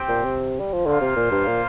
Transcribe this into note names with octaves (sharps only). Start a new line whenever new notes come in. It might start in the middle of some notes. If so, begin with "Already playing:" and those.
Already playing: C4 G4 C5 G5
A#2
C3
G3
F3
D3 A#3 F4 C5 F5
C3
A#2
G2
A#2